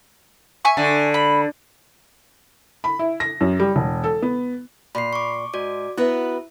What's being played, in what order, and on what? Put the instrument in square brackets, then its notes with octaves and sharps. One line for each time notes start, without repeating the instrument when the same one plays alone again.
[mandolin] E5 G#5 C#6
[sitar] D3
[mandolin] B5
[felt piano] B5
E4
A#6
F#2
G3
E1
A4
B3
[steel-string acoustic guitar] A#2 [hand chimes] B5 C7
[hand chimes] C#6 D6
[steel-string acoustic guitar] G#2 [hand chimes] F#4 D5 D6
[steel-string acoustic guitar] B3 F#4 B4 [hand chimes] E4 E5